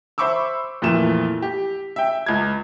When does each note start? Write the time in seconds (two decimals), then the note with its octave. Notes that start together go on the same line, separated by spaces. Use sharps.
0.18 C5 E5 B5 C#6 D6 E6
0.82 F2 A#2 E3 A3 E7
1.42 G4
1.96 E5 G5
2.26 C#2 G#6